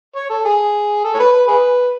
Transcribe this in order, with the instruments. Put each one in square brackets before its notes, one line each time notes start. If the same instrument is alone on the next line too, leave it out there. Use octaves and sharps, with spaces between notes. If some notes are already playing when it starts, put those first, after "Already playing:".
[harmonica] C#5
A4
G#4
A4
C#5
B4
B4
G#4 B4